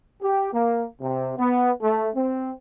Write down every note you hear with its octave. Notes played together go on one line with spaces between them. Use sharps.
G4
A#3
C3
B3
A3
C4